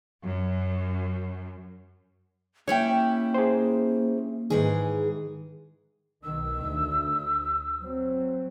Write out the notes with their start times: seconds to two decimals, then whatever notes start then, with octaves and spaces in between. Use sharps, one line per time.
0.24 F#2
2.68 A#3 C#4 E4 G4 C#5 G5
3.34 G#4 C5
4.50 G#2 D#3 E3 G#4
6.24 B1 D#3 E6
6.61 D2
7.80 F#3 C4